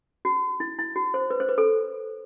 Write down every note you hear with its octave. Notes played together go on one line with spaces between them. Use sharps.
F#4
E4
E4
F#4
C5
B4
C5
B4
A4